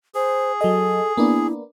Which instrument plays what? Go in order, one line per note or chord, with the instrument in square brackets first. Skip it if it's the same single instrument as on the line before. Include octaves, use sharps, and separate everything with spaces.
[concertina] G#4 [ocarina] C5
[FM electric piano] F#3 D#5 [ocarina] A4
[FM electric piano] A#3 B3 D4 [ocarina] E4